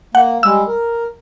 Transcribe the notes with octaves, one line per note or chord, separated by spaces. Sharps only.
A#3 F#5
G3 G#3 E6
A#4